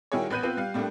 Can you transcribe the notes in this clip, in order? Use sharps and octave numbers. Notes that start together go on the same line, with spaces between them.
D#3 G3 E4 F#4 G#4 C#5
A1 B3 B5 F#6 G6 D#7
B3 C4 F4 B4
G3 F5
A2 G3 A3 A#3 D4